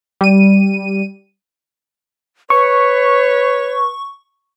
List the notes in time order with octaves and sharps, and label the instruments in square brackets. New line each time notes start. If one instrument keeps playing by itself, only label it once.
[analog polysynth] G3 D#7
[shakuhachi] B4 [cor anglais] C#5 [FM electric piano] C#6